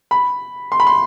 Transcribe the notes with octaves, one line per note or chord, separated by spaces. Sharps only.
B5
C6
B5
C6